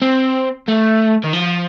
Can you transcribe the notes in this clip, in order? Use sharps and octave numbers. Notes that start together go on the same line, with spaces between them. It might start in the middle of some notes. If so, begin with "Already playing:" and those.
C4
A3
D#3
F3